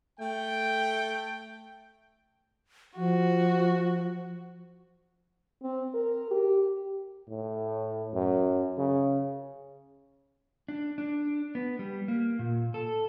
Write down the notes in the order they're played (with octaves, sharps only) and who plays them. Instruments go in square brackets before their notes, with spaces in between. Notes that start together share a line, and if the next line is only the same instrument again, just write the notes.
[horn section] A3 G5
[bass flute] F3 [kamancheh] F#4
[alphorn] C4
A#4
G4
[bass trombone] A2
F#2
C#3
[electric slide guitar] D4
D4
B3
G3
A#3
A#2
A4